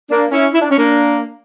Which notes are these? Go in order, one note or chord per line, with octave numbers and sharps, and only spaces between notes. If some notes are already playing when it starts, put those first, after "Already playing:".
A#3 D4
C#4 E4
E4
D4
C#4
A#3 D4